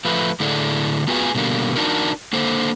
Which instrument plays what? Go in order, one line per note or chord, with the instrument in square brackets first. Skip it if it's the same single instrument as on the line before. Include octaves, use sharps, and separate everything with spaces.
[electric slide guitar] F3 A3 B4
A2 D3 E4 G#4 A4 D5
B3 F4 F#4 G#4 B4 G#5
B2 D3 G3 A#3
D4 D#4 F#4 A#4
A#3 D4 A4 C5